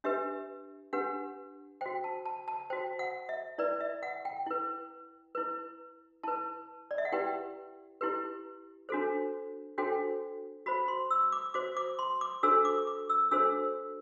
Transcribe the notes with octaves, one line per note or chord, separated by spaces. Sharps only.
D4 G4 B4 E5
D4 G4 B4 F#5
F#4 C5 G5
A5
A5
A5
F#4 C5 G5
F#5
E5
E4 B4 D5
E5
F#5
G5
E4 B4
E4 B4
E4 B4 A5
D5
E5
F#5
E4 G4 B4 G5
E4 G4 B4
D4 F#4 A4 C5
D4 F#4 A4 C5 G5
F#4 C5 B5
C6
E6
D6
F#4 C5 D6
D6
C6
D6
D4 F#4 A4 C5 E6
D6
D6
E6
D4 F#4 A4 C5 E6